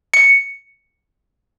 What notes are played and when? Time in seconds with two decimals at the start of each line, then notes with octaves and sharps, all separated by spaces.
0.14 C#7